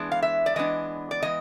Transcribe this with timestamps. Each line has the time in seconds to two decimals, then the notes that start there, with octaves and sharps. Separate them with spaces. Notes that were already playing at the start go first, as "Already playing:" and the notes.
Already playing: E3 G#3 B3 D4
0.12 F5
0.22 E5
0.46 D5
0.56 E3 G#3 B3 D4 D#5
1.11 D5
1.22 E3 G#3 B3 D#5